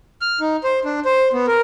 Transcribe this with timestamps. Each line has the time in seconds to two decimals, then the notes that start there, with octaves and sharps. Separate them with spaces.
0.21 F6
0.41 D#4
0.64 C5
0.85 D4
1.05 C5
1.33 B3
1.47 A#4